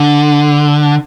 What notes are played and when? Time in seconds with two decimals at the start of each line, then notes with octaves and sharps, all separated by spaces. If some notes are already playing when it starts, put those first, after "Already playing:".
Already playing: D3